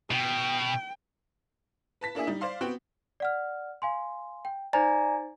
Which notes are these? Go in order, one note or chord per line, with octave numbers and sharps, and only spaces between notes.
B2 G5
B4 A5 B6
A#3 D4 E4 G#4
G3 D#4
C5 D5 F5 C6
B3 C4 F#4 B4 G5
D5 F#5 F6
F5 G#5 C6
G5
D#4 C5 D5 G#5 A#5 A6